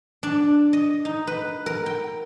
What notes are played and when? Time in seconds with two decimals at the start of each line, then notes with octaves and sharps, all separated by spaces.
0.23 D4
0.73 D#5
1.05 D#4
1.27 B4
1.66 A#4
1.86 G5